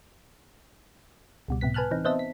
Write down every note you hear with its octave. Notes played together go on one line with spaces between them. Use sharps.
C#2 B2 G3
A2 C3 B3 B6
B4 G#5 A5 F6 F#6
E3 C4 D#4
B3 C4 C5 D#5 E5 A5
B6